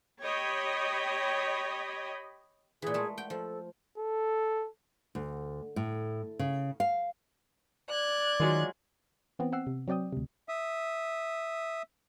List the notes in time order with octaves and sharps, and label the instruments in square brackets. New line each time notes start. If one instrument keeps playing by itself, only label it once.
[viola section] G4 C#5 D#5 G5 B5
[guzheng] A#2 E3 [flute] G#4
[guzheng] G#3 A3
[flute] F#5 [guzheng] G5
[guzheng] F3 [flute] A4
[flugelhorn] A4
[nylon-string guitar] D2
A2
C#3
F5
[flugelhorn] D5 [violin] F#6 G#6
[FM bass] D#3 [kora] F#3 G#3 F4
[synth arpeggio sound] E3 B3 C4
C4 F#5 E6 C7
C3
F#3 C4 D5 G5 D#6
D2 C3
[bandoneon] E5 D#6